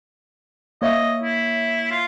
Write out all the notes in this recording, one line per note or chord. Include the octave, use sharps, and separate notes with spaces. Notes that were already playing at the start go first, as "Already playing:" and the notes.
A#3 C#5 D#5 E5
E4
F4